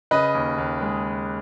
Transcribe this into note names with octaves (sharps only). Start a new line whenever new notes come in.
C#3 B4 D#5
D#2
D#2
G#3